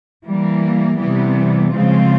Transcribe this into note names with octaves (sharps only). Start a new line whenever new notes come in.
E3 G3 A#3
C3 E3 G3 B3
C#3 F3 G#3 C4 F4